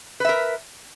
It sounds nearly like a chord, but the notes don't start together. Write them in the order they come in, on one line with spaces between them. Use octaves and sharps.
B4 E5 A#4